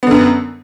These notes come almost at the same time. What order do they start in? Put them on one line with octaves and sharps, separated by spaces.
B3 D3 F#2